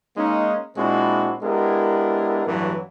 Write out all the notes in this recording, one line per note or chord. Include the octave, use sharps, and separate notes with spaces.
G#3 A#3 C#4 D#4
A#2 G#3 C4 D4 E4 F#4
G#3 B3 D4 E4 G4 A#4
A1 G2 E3 F#3